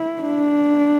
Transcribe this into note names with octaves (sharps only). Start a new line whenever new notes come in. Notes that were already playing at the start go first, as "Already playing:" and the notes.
Already playing: E4
D4